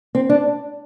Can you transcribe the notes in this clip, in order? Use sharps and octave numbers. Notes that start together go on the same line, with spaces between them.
C4
D4